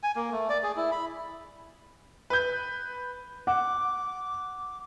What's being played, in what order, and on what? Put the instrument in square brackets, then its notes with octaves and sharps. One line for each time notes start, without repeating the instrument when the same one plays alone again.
[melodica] G#5
A#3
A3
D5
G#4
E4
B5
[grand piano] B4 G6
[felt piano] F#5 [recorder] D6